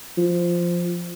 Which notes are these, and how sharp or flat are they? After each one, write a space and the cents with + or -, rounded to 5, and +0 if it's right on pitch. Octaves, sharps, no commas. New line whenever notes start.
F3 -5